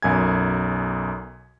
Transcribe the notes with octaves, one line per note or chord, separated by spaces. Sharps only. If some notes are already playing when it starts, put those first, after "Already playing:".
B1 F#2 G#5 G#6